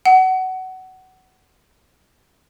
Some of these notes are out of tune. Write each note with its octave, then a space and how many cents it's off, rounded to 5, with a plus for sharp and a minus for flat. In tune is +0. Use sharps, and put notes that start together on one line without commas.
F#5 +20